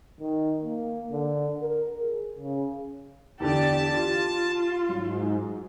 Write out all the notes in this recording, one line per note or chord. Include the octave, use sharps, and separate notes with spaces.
D#3
A#3
D3
A#4
G#4
C#3
E2 D3 G4 D5 A5
F4 G4
G#2 F#3